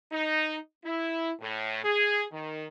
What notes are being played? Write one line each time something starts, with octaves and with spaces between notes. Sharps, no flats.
D#4
E4
A2
G#4
D#3